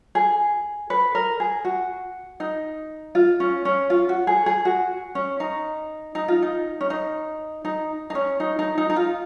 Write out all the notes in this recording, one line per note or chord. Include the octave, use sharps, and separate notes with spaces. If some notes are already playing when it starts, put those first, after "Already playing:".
G#4
B4
A#4
G#4
F#4
D#4
F4
C#4
C#4
F4
F#4
G#4
G#4
F#4
C#4
D#4
D#4
F4
D#4
C#4
D#4
D#4
D#4
C#4
D#4
D#4
D#4
D#4
F4